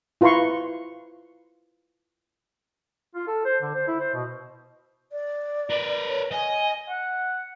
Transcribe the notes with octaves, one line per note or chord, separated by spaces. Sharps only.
E4 F4 B4 A#5 C6 C#6
F4
A4
C5
D3
C5
E4
C5
B2
D5
A#4 B4
C#5
D#5 G#5
F#5